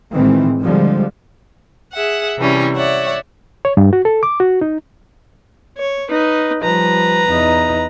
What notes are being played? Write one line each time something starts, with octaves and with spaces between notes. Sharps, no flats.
A2 D#3 E3 G#3 C4
D3 F3 G3 G#3
G#4 E5 F#5
C3 E3 G3 C#4
C#5 D5 E5 F#5
C#5
G2
F#4
A4
D6
F#4
D#4
C#5
D#4 B4
F3 G3 B4 A#5
E2 D#4